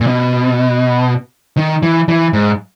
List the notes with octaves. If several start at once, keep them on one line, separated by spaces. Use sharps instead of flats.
A#2
B2
D#3
E3
E3
G#2